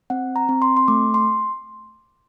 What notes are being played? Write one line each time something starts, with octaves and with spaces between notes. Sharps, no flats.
C4 F#5
A#5
C4
C6
C6
A3 D6
C6